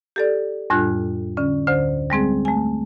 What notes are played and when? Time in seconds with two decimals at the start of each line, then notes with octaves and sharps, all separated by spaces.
0.16 G4 A4 D5
0.70 F2 A2 G3 D4 F4 F#6
1.37 D3 C#4
1.67 D2 D3 C5
2.10 G3 G#3 C4 G#4
2.45 A3 G#5